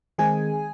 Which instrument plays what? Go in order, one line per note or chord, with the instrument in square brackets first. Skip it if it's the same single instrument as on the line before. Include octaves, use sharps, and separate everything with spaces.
[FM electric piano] D#3 G#3 C4 D#4 G#4 G#5